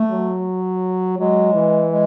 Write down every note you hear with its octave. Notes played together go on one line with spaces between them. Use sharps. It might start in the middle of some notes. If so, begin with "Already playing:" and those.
Already playing: A3
F#3
F#3 G#3
E3
G#3